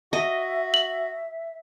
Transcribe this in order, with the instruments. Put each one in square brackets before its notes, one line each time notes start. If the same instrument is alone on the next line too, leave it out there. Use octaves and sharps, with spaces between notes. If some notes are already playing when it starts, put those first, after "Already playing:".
[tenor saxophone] F#4 [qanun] D#5 [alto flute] E5
[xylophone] F#7